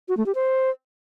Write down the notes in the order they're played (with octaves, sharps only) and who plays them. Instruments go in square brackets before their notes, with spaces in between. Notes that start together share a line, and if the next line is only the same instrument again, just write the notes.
[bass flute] F#4
A3
G4
C5